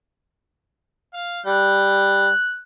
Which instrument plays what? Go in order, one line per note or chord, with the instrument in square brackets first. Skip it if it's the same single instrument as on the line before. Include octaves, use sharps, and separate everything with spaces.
[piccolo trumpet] F5
[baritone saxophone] G3 [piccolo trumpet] F#6